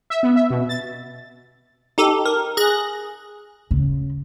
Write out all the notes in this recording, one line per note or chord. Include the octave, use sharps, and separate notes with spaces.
E5
B3
E5
B2
A6
D#4 G4 A4
A#4
G#4 F#6 A#6
C#3